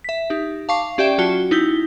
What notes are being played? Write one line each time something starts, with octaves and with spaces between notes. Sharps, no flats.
E5 B6
D#4 G4
F5 A5 C#6 D6 C7
C#4 G4 D5 E5 G5 E7
F#3 F4 F#4 A5 G7
D#4 E4 G6 G7